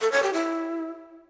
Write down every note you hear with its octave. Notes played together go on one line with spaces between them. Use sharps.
A4
C#5
G4
E4